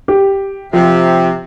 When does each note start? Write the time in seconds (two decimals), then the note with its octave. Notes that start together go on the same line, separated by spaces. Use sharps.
0.08 G4
0.73 C3 F3